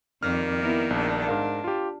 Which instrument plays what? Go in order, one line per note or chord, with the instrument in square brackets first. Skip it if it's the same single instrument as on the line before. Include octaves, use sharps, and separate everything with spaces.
[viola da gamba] F2 [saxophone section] D#3 G3 A#3 [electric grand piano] F6
[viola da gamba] B3 E4 A#4
[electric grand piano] A#1 [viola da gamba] D4
[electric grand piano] G#2 A#4 F5
F4 G4